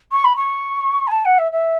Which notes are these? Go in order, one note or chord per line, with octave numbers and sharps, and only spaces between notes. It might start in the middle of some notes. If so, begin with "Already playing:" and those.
C#6
B5
C#6
G#5
A5
F#5
E5
E5